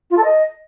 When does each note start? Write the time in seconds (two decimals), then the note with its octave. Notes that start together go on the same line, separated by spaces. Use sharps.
0.10 F4
0.17 A4
0.24 D#5